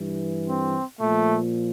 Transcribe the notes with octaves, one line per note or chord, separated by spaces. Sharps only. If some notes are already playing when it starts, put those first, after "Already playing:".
Already playing: G2 E3
C4
A#2 F3 A3